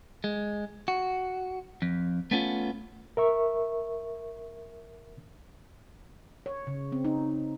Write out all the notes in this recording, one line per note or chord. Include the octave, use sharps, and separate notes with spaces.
G#3
F#4
F2
A3 B3 C#4 D#4 F4
A#4 E5 C#6
C#5
C#3
C4
D#4